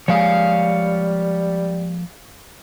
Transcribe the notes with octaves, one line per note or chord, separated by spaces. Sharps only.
F3 G3 G#3 A#3 C#5 F5